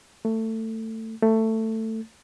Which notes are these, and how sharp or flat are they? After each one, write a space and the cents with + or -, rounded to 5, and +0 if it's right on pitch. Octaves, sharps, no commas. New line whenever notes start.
A3 +20
A3 +15